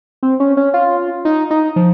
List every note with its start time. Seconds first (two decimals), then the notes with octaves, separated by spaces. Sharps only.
0.23 C4
0.40 C#4
0.57 C#4
0.74 F4
1.25 D#4
1.51 D#4
1.76 F3